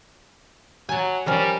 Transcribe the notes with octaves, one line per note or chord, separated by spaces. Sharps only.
F#3 G#5 A5
F3 G3 C#4 A#4